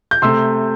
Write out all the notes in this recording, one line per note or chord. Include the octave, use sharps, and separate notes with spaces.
G6
C3 A3 C6 E6